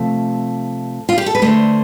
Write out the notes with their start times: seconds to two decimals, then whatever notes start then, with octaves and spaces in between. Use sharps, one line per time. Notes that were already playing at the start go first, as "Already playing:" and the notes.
Already playing: C3 F3 A3
1.09 F4
1.18 G4
1.26 A4
1.35 B4
1.42 D3 A3 C5